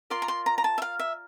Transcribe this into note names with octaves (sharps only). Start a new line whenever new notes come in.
F4 A#4 D5 C6
A#5
C6
A#5
A#5
A5
E5
F5
E5